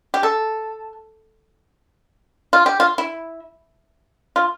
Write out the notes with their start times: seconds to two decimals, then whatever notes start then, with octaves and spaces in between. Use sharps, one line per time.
0.14 G4
0.23 A4
2.53 F4
2.66 G4
2.80 F4
2.98 E4
4.36 F4